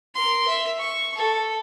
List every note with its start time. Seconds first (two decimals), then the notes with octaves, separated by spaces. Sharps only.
0.15 A#4 C6
0.47 E5
0.79 C#6
1.16 A4